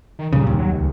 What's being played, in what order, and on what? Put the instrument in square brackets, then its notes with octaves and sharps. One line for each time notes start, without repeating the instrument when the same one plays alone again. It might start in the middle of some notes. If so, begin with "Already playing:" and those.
[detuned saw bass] D#3
[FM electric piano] C2 F#2 G3 [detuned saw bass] A#2 [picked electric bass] C#3
[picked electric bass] D#2
[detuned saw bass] F#3
C#2